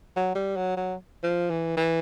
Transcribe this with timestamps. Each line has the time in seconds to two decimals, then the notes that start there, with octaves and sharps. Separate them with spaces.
0.16 F#3
0.35 G3
0.57 F#3
0.77 F#3
1.23 F3
1.50 E3
1.77 E3